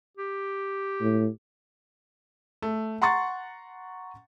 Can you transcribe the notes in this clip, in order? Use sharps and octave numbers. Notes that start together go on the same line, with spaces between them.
G4
A2
A3
F#5 A#5 C6 C#6 A6